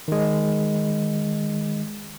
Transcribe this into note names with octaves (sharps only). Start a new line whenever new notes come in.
D#3 G#3